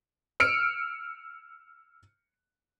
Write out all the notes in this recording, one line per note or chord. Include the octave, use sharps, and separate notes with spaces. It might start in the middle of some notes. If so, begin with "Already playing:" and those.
E6 F6 C#7 D7